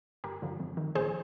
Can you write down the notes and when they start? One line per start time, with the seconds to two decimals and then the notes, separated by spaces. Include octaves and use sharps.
0.24 G1 G4 A#4
0.42 G2 D3 F3
0.60 F2
0.77 D#3
0.95 A#1 G#4 C5